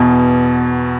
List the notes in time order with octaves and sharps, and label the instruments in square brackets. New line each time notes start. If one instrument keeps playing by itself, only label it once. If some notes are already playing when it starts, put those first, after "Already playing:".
Already playing: [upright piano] E2 B2